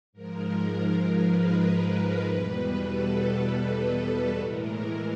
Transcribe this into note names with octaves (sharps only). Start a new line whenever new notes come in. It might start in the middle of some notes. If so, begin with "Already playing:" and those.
G#2 F3 G#3 A#4
A#4
B4
E2 B2 G3
A4
A4
A2 E3 G#3 A#4